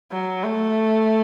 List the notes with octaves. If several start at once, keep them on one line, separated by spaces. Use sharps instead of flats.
F#3
A3